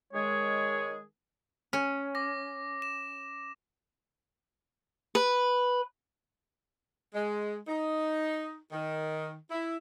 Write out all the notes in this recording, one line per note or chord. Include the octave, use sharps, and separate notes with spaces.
D#3 G#3 G#4 C#5
C#4
D6 A#6
E7
B4
G#3
D#4
D#3
E4